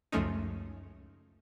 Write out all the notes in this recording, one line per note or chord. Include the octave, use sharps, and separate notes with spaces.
C#2 F#2 F3 A3 C#4 D#4